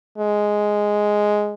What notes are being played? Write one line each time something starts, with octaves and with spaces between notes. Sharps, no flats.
G#3